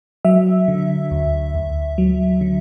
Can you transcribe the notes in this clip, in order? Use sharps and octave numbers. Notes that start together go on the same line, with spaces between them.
F#3 E5
D3
D2
D2
F#3
D3